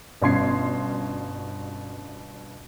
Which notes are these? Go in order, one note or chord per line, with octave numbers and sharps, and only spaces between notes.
G1 B2 C#4 C6 G#6 C7